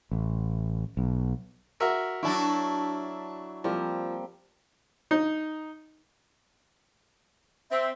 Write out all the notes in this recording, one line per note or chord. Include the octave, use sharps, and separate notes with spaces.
A1
B1
F#4 A#4 E5
F#3 D4 E4 A5 C#6
F3 G3 A#3 C4
D#4
C4 E5